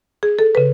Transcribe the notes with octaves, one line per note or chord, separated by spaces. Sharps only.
G#4
A4
C#3 B4